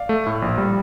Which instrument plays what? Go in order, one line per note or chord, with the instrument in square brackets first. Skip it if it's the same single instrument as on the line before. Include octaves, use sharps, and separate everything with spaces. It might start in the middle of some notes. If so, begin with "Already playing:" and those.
Already playing: [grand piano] D5 F5
[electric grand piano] A3
A2
A#1
G3